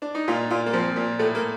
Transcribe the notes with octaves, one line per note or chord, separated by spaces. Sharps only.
D4
D#4
A#2 F4
A#2 F4
A#3
F3 C4
A#2
A2 A3
A#3